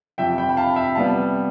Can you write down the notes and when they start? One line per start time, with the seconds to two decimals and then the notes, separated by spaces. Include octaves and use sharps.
0.18 F2 C3 F3 E5 G5
0.38 G5 B5
0.49 B5
0.57 F5 A5
0.76 E5 G5
0.95 C3 G3 B3 F5 A5